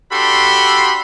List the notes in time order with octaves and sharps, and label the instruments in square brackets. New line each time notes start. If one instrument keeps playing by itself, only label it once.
[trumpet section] D4 F#4 G4 A4 B5 C6